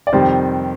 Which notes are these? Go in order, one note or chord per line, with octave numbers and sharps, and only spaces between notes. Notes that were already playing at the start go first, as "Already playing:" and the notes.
D5
F2 C3 D#3 G3 C5